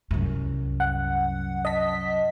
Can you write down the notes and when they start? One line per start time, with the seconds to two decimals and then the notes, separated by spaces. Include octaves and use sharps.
0.11 C2 F#2
0.80 F#5
1.65 D#5 A5 B6